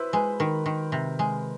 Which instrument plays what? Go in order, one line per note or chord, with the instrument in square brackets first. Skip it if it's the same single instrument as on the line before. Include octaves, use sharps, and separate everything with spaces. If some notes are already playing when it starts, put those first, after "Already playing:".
Already playing: [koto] E4 [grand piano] B4 C5
[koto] G#3 [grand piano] B4
[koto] D#3 [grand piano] A#4
[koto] D#3
C3
G#3